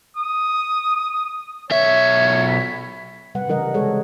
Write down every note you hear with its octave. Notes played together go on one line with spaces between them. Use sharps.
D#6
B1 C#5 E5
B5
C3 G3 B4 F#5
C#3 E3 G3 A#4 D#5 F#5
C3 G#3 G#4 A4 C#5